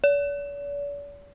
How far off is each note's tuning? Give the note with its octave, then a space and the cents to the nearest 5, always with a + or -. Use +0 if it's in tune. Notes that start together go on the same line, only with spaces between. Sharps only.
D5 -45